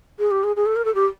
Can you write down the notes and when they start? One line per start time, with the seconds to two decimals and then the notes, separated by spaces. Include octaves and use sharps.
0.19 G#4
0.31 G4
0.44 G#4
0.56 G#4
0.66 A4
0.76 A#4
0.85 A4
0.95 G4